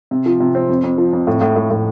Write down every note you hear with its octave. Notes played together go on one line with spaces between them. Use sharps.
C3
F3
C3
C4
F2
F2
F3
F2
A2
A2
A2
A2